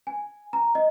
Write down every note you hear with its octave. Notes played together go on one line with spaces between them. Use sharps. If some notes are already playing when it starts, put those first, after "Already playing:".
G#5
A#5
D#5